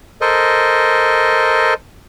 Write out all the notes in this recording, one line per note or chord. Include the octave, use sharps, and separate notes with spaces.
A4 A#4 C5 D#5